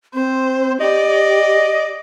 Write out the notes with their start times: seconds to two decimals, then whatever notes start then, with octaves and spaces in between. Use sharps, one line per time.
0.14 C4 C5
0.81 G4 D5 D#5